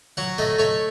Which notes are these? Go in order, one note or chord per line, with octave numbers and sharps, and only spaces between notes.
F#3 F#5
A3 D#5
A3 C#5